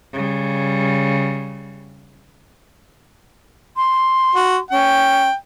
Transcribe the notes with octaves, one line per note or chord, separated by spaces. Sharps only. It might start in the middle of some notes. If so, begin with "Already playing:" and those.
C#3 G3
C6
F#4
C#4 G5